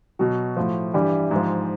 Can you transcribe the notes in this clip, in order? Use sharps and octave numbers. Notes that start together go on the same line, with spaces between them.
B2 F#3 F#4
A2 F3
G2 E3 G3 G4
G#2 F3